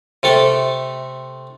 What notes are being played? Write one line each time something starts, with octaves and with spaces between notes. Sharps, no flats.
C3 A3 A4